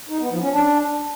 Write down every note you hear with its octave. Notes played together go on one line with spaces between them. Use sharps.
D#4
B3
F3
C#4
D4